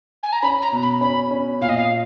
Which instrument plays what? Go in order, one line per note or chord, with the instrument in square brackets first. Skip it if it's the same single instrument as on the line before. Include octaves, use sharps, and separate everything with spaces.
[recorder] G#5
A#5
[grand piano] C#4 [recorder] B5
[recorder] A#5
[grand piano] B2
[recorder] B5
[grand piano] C#4 [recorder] B5
[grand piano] C#4
[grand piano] A#2 [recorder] F5
[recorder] D#5
F5